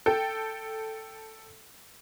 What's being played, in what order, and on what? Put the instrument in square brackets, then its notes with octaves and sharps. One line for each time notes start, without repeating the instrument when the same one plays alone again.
[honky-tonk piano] A4 G5